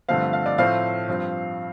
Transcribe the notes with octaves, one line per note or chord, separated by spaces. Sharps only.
G2 D3 F3 A3 C4 F5
F5
D5
A2 F3 A3 C4 F5
G2 F3 C4